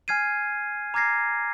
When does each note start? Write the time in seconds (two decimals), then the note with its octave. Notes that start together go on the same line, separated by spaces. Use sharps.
0.08 G#5 F6 G#6 C7 D#7
0.94 A#5 D6 F6 G#6 A#6 C7